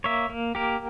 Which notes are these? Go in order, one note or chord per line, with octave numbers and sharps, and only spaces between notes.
A#3 C#5 E5
A#3
A#3 G4 A#4